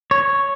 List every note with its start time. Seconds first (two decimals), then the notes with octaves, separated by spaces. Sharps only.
0.11 C#5